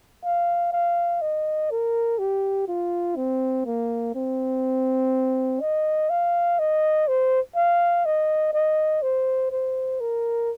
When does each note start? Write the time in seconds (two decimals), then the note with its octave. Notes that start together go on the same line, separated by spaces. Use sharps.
0.24 F5
0.73 F5
1.22 D#5
1.71 A#4
2.19 G4
2.68 F4
3.16 C4
3.66 A#3
4.15 C4
5.61 D#5
6.10 F5
6.59 D#5
7.08 C5
7.56 F5
8.05 D#5
8.54 D#5
9.02 C5
9.52 C5
10.01 A#4